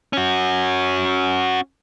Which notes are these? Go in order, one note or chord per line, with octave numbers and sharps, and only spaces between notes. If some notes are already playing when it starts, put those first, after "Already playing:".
C#4 F#4